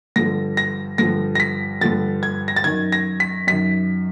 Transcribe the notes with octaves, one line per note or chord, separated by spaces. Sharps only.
G2 D3 F3 A#6
A#6
G2 D3 F3 A#6
A#6
B6
G2 D3 F3 A6
G#6
A#6
A6
F#2 D#3 G#6
A#6
B6
F#2 D#3 B6